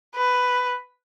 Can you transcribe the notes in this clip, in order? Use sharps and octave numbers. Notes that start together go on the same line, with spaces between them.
B4